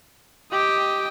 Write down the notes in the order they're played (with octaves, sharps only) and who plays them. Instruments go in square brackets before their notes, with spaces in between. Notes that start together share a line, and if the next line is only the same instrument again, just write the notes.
[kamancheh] G4 [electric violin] D#5 G5